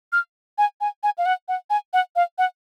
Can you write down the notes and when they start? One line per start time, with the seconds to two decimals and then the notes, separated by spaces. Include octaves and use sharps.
0.13 F6
0.58 G#5
0.81 G#5
1.03 G#5
1.18 F5
1.26 F#5
1.48 F#5
1.70 G#5
1.93 F#5
2.16 F5
2.38 F#5